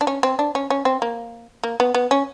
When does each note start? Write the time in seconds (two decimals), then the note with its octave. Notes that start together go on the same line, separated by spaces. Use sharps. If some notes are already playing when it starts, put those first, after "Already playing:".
0.01 D4
0.07 C#4
0.23 C4
0.39 D4
0.55 C#4
0.70 C#4
0.85 C4
1.02 A#3
1.64 A#3
1.80 B3
1.95 B3
2.11 C#4